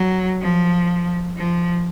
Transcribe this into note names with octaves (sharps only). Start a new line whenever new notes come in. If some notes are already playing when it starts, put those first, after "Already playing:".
Already playing: F#3
F3
F3